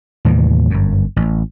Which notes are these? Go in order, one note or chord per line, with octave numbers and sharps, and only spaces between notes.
D#2 A2 C3 E3
G1 F#2
A1